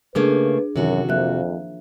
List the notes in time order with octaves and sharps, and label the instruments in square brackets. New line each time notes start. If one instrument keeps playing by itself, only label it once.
[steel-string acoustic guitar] C#3 A3 A#3 [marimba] D4 G#4 [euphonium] B4
[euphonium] F#2 [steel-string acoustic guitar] C3 F#4 [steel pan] D#3 E3
[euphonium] F2 [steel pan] F3 A#3 [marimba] E5 F#6